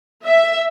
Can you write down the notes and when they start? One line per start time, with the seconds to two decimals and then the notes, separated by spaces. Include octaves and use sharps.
0.23 E5